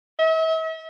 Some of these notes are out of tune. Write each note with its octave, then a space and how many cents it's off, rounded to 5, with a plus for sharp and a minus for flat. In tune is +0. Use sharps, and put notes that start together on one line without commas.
E5 -40